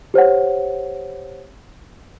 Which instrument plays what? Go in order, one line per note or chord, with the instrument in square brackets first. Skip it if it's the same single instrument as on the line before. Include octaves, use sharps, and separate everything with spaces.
[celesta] G4 C5 C#5 F#5